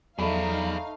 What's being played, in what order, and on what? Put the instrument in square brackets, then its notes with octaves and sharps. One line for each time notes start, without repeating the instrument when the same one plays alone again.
[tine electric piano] E2 F#3 [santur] A3 B5 [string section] D#4 F5 [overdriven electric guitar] G#4 D5